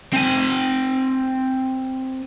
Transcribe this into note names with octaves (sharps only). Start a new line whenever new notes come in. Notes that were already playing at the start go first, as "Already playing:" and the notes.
C4 G#5